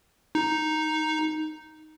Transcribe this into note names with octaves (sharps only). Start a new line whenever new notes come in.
D#4